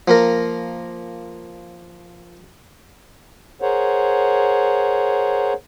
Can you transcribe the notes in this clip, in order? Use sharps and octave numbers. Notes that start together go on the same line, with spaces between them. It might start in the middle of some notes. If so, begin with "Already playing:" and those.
F3 A#3 A#4
G#4 A#4 C5 C#5 F#5